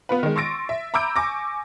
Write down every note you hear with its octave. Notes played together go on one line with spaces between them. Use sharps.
B3 F4 B4
D#3 G#3
C6 C#6 E6 A6 A#6 D7
E5
A#5 B5 D6 E6 G6 D7
G#5 C#6 D6 A#6